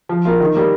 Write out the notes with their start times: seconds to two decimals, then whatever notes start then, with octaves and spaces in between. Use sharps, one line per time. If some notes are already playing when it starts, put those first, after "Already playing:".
0.09 F3
0.25 A#3 F4 A#4
0.40 D#3
0.55 G3 A#3